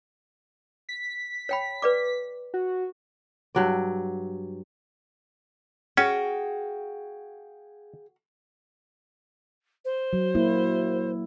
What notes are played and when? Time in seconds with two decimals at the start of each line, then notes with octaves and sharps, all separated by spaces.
0.89 B6
1.49 C#5 G5 B5
1.82 B4 D5 D6
2.54 F#4
3.55 G2 F#3 D5
5.97 C#4 F#4 G#4 F5 G5
9.85 C5
10.13 F#3
10.35 A#3 E4 F#4